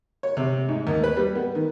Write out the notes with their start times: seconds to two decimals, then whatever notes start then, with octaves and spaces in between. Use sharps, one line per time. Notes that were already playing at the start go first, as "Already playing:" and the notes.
0.23 C#5
0.37 C3
0.69 G#2
0.87 D#2
1.04 B4
1.17 G3
1.35 B3
1.55 D#3